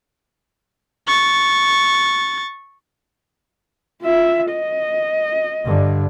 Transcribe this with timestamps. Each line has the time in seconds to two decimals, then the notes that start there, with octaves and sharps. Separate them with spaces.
1.07 C#6 A6
4.02 F4 E5
4.50 D#5
5.64 G2 D3